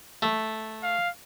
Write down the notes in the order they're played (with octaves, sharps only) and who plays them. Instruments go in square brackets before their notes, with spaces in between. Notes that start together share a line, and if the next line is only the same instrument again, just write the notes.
[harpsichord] A3
[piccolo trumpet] F5